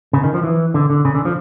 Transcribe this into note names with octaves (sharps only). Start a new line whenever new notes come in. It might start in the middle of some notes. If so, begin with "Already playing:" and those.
C#3
D#3
F3
E3
D3
D3
C#3
D3
F3